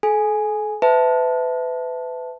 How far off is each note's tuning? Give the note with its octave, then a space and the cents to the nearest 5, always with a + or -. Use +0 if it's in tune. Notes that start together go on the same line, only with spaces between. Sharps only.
A4 -40 G#5 +0
B4 +30 E5 +0 A5 +0